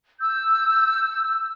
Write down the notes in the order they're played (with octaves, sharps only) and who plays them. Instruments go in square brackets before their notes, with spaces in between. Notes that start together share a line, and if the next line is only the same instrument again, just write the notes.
[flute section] E6 G6